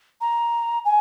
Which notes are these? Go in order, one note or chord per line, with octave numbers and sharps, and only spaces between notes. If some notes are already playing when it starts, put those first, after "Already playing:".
A#5
G#5